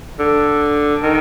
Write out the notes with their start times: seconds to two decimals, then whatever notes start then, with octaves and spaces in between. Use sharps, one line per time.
0.19 D3
1.03 D#3